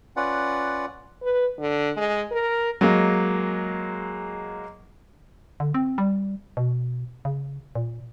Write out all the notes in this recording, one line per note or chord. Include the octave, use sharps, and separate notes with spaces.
C#4 F4 B4 D5 F#5
B4
D3
G#3
A#4
F#3 G#3 A#3
D3
C4
G3
B2
C#3
A#2